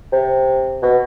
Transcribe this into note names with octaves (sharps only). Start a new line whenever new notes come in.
C3
B2